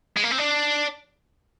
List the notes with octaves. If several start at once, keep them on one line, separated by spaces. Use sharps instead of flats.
G#3
A#3
C4
D4